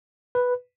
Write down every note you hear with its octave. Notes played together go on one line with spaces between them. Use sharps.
B4